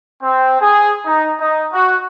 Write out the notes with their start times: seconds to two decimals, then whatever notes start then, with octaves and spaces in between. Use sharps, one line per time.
0.22 C4
0.60 G#4
1.06 D#4
1.39 D#4
1.73 F#4